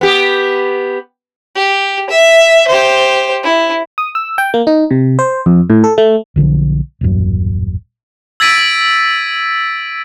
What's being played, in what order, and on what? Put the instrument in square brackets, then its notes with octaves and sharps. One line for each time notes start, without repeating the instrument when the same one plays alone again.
[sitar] B3 G4
[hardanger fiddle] G4
E5
G4 C5
E4
[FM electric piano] D#6
E6
G5
A#3
D#4
C3
C5
F2
A2
A4
A3
[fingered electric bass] B1 D3 D#3 F3
D#1 A1 F#2
[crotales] E6 G#6 A6 B6 D7 D#7